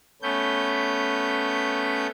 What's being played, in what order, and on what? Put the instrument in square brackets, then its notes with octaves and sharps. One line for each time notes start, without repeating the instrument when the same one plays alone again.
[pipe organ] A3 B3 C#4 G6